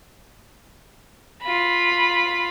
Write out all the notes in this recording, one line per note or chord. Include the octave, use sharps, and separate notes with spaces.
F4 B5